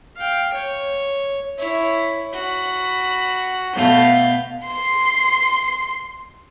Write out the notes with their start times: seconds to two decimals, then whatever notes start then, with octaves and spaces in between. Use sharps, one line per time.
0.17 F5 G5
0.54 C#5
1.59 E4 C#5
2.33 F#4 B5
3.76 B2 A3 F5 G6
4.66 C6 C7